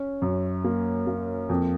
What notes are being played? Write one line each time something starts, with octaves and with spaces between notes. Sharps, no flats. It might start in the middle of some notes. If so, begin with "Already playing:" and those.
Already playing: C#4
F#2
A#3
A#3
F2